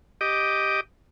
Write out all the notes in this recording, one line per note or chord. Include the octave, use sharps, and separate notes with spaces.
G4 D#5 D6